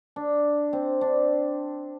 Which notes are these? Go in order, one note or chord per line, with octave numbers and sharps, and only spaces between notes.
D4
C4
D4